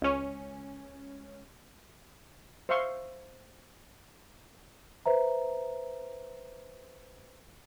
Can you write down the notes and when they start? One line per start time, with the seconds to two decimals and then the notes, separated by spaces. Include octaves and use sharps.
0.02 C#2 C#4
2.69 C5 E5 F5 C6 C#6
5.06 B4 C5 E5 A#5